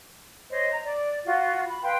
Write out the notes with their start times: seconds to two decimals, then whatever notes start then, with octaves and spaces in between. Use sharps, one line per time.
0.50 C5 C#5 D#5
0.71 A#5
0.83 D5
1.25 F4 F#4
1.67 B5
1.82 B4 F5 G5 C6